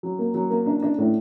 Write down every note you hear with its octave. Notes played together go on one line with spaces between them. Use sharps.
F#3
A#3
F#3
A#3
D4
D4
A2